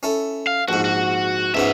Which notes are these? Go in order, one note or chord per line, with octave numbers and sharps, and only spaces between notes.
C#4 E4 A4
F5
A#1 G#2 F#4
F#4
C#2 G#2 B3 C#4 E5